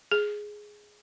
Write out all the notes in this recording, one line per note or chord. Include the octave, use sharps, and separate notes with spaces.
G#4